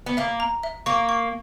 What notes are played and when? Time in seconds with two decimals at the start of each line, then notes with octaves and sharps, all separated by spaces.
0.06 B3
0.17 A#3 E5
0.40 A#5
0.63 E5
0.86 A#3 C#6
1.09 C#6